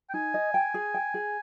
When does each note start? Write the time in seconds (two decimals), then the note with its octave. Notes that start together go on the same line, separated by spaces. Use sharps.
0.10 G5
0.14 D#4 G#5
0.34 D#5
0.54 G5
0.74 G#4
0.94 G5
1.14 G#4